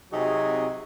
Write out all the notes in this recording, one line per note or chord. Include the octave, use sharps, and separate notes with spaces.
C3 F#3 C4 D#4 F#4 G#4